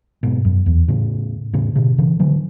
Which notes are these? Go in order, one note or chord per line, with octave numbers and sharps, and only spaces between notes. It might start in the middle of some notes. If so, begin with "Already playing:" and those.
G#2 B2
F#2
E2
A2 C#3
A2 C#3
B2 D3
C#3 E3
D3 F#3